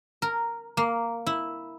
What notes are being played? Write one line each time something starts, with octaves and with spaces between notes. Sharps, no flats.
A#4
A#3
E4